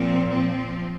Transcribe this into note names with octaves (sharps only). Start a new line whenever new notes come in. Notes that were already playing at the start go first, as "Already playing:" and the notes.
Already playing: A#2 F3 C4
F3 C4